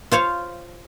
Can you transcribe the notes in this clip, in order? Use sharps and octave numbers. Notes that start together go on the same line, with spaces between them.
F4 C5 C#5 F5